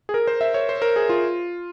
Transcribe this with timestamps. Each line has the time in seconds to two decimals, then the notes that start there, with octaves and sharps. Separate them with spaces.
0.09 G#4
0.14 A#4
0.27 C5
0.41 E5
0.54 C#5
0.69 C5
0.82 A#4
0.96 G#4
1.09 F4